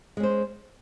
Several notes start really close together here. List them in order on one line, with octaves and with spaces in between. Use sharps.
G#3 C#4 C5